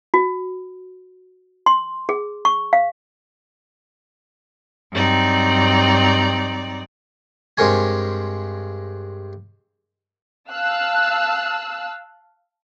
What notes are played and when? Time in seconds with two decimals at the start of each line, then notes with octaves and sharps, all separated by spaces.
0.14 F#4
1.66 C6
2.09 G#4
2.45 C#6
2.73 F5
4.92 G2 F#3 C4 D#4 D5
7.58 G2 G#3 C4 A#4 C#5 G#5
10.51 F5 A5 E6 F#6